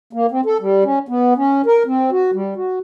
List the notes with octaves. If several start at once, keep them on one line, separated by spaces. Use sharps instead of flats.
A#3
C4
A4
G3
C#4
B3
C#4
A#4
C4
F#4
G3
F#4